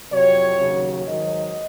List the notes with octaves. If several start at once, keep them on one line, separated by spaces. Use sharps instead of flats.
F2 C3 F#3 C#5
D#2 C#3 F#3
G#2 D#3 F#3 D#5